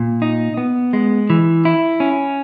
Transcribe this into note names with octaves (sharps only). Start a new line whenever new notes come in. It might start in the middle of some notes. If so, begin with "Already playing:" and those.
Already playing: A#2
D#4
B3
G#3
E3
E4
C#4